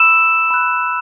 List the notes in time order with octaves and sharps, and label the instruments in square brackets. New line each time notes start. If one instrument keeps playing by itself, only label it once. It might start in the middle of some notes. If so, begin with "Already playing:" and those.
Already playing: [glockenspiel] B5 E6 E7
B5 F#6